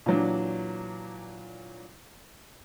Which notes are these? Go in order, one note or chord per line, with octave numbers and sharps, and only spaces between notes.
A#2 E3 F#3 D4